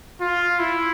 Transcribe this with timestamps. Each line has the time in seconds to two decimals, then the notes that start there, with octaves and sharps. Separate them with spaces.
0.21 F4
0.60 E4